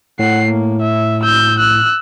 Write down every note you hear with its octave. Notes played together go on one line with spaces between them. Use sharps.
A2 F#5 C7
A#3
E5
E6 G6
E6 F#6